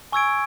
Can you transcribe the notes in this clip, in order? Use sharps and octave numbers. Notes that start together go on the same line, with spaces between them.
G#5 C#6 E6 G#6 D7